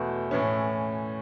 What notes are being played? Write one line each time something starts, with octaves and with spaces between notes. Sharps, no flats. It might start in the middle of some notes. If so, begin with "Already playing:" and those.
Already playing: E2 B2 A3
A2 E3 C#4